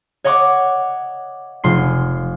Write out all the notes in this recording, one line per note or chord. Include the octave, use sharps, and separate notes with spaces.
C#5 D#5 F#5 C#6 D6
F1 C6 C7